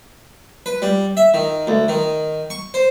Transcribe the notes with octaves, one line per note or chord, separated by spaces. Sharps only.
B4
G3
E5
D#3
D2
D#3
C#6
C5